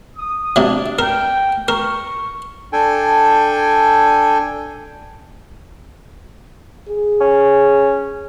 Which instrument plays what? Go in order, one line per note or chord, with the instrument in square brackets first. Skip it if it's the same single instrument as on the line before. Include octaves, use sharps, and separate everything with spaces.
[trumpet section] D#6
[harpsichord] C3 F#3 [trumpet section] D4
[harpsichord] A#4 [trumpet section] G5
[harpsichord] A#4 [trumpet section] C#6
[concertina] D4 A4 G5 G#5
[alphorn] G#4
[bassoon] C#4